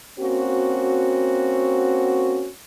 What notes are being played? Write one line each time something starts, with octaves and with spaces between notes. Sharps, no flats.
A#3 C4 C#4 F#4